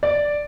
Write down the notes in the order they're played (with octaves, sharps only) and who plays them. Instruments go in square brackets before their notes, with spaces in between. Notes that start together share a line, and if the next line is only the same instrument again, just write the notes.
[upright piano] D5